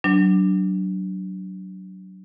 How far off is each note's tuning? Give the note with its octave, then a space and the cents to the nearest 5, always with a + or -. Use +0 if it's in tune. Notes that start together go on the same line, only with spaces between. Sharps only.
F#3 +20 D4 +0